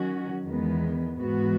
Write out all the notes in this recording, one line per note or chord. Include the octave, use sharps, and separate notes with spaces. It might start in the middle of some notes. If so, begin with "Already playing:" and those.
Already playing: D#3 F#3 C#4 F#4
E2 D#3 G#3 B3
G#2 E3 B3 F#4